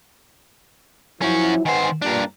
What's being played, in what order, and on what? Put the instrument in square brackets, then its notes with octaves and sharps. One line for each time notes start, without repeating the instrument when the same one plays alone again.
[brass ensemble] F3 F#3 E4 [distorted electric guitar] C#4 F#4
[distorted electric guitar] D#3 C5 [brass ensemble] B4 F#5 G#5
[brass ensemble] G2 A#2 [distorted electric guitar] D4 A#4